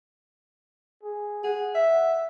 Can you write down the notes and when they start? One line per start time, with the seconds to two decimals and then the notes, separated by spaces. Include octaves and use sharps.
1.03 G#4
1.44 G#4 F#5
1.75 E5